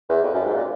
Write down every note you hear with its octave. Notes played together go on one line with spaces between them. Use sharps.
E2
F2
F#2
G#2
A#2